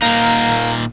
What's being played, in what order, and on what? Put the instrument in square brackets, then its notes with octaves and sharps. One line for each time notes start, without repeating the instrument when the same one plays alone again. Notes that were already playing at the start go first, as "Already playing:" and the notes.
[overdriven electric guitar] A#2 D#4 [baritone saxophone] A#3